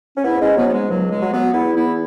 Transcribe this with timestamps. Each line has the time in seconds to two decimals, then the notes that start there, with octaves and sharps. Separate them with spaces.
0.17 C#4
0.24 G#2 B3 E4
0.41 G#3 C#4
0.57 G#2 F#3 B3
0.69 B3
0.74 G#3
0.90 C#2 F#3
1.11 G#3
1.22 F#3
1.33 F#3 B3
1.54 E2 B3 E4
1.75 B3 E4
1.86 E3